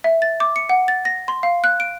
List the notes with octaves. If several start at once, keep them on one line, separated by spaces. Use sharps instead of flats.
E5
A6
D6
C#7
F#5
A6
A#6
C6
F5
F#6
D7